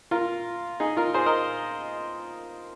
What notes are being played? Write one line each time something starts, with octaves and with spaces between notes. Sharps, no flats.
F4 A#4
D#4 G#4
F4 A#4
G#4 C5
A#4 D#5